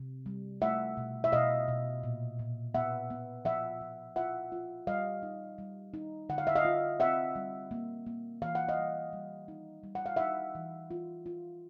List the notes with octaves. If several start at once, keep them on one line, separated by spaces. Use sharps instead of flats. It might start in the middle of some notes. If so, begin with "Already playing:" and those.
Already playing: C3
G3
A3 E5 F#5
B2
E5
B2 D#5 F5
B2
A#2
A#2
B3 E5 F#5
B3
F3 E5 F#5
F3
F4 E5 F#5
F4
G3 D#5 F5
D#4
G3
D#4
D3 F#5
F5
E5
D#5 F5
F4
C4 E5 F#5
G3
A#3
A#3
E3 F5
F#5
D#5 F5
G3
G3
D#4
G3
F#5
F5
D#4 E5 F#5
E3
F4
F4